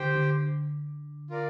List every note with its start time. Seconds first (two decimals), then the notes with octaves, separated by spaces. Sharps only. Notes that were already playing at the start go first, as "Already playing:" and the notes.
Already playing: D3 G4 C5 G5
0.15 D3
1.30 F4 A#4 D5